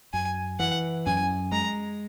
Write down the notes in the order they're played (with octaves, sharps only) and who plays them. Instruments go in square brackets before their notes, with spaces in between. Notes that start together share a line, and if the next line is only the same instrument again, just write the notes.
[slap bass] F#2 [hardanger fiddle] G#5
[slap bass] E3 [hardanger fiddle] F#5
[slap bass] F#2 [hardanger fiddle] G#5
[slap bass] G#3 [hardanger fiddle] A#5